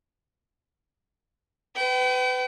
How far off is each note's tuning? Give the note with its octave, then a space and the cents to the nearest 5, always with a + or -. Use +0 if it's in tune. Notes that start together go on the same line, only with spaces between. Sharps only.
B4 +30 G5 -40